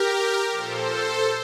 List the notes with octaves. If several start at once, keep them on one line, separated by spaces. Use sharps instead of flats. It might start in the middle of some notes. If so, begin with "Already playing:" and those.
Already playing: G4 A#4
A#2 F3 A4 C5